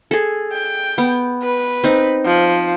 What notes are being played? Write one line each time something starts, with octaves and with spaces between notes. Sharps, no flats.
G#4 A4
G5
B3
B4
C4 D#4
F3